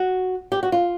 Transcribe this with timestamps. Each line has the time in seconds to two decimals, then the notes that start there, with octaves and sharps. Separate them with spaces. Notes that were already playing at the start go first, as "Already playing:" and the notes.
Already playing: F#4
0.52 G4
0.63 F#4
0.72 F4